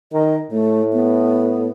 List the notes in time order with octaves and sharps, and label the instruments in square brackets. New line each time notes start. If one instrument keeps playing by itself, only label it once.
[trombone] D#3 [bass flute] D#5
[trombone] A2 [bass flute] A3
[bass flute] B3